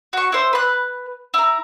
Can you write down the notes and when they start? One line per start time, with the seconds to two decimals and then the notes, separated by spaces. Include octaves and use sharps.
0.13 F#4 C#6
0.32 E4 C5
0.53 B4 F#6
1.34 E4 A#5